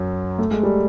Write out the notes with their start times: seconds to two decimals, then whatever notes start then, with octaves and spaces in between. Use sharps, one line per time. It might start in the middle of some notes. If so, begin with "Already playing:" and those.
Already playing: F#2 F#3
0.39 A3
0.51 G#3
0.63 G3